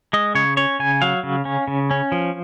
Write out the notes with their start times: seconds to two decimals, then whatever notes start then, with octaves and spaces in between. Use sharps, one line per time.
0.13 G#3 D#5
0.35 C#3 C#5
0.57 C#4 C#5
0.79 C#3 G#5
1.02 F#3 F5
1.23 C#3
1.45 C#4
1.68 C#3
1.91 C#4
2.12 F3